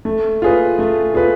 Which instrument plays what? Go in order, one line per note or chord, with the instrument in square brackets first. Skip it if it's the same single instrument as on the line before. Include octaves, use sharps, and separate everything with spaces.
[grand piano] A3
F4 G#4 B4
A3
F4 G#4 B4